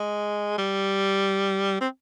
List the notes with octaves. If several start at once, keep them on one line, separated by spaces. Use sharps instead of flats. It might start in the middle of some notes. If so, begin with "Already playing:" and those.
Already playing: G#3
G3
C4